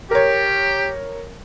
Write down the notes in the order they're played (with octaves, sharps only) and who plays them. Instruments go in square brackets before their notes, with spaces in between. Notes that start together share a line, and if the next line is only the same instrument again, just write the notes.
[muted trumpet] G4 [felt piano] A#4 C#5